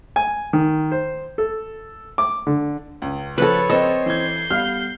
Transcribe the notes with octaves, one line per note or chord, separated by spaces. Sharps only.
G#5
D#3
C5
A4
D6
D3
C#2
C#3 F3 A4 B4 C#5
C4 A4 D#5
E3 G6 G#6 C7
G3 B3 F5 F6